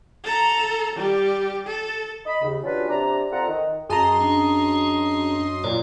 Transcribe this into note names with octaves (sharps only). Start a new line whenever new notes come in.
A4 A#5
G3 G4
A4
D#5 B5
D#2 C#3
F#3 C#4 D4 F4 G4 B4
C3 D4 D5 A#5
C4 F4 A4 D5 F#5 A#5
D#3 D#5
F#2 G#4 D#5 A5 A#5 C6
C#4 D4
A#2 C#5 D5